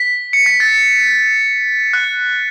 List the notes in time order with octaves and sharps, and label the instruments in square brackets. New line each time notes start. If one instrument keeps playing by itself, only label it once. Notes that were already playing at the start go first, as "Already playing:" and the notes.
Already playing: [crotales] B6
C#7
B6
A6
F#6